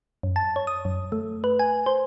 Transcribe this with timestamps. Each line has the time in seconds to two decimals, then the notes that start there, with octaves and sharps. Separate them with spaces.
0.23 F#2
0.36 A5
0.56 C#5
0.67 D#6
0.85 F#2
1.12 A3
1.44 B4
1.59 G#5
1.86 C5